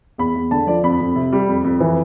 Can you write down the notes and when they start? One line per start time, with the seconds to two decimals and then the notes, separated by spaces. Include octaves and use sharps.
0.18 E2 B5
0.35 E2
0.51 D3 A5
0.67 F3 D5
0.83 F2 B5
1.00 F2
1.16 C3
1.32 G3
1.49 F2
1.64 F2
1.80 E3